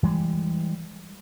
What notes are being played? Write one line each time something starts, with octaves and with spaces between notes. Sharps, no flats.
E3 G3 G#3